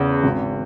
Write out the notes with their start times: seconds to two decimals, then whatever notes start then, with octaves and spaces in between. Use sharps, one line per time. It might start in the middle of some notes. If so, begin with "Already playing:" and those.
Already playing: E2 C#3
0.24 G#1